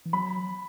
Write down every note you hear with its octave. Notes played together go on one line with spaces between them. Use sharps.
E3
F#3 B5